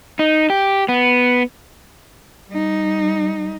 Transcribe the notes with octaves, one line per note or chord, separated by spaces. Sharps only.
D#4
G4
B3
G3 D#4